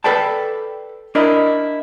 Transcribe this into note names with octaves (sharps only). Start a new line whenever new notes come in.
A4 B4 D5 G5 A5
D4 E4 A#4 D5 D#5